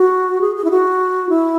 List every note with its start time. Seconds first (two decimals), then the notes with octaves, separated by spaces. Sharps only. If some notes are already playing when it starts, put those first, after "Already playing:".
Already playing: F#4
0.41 G#4
0.56 G#4
0.65 E4
0.71 F#4
1.29 E4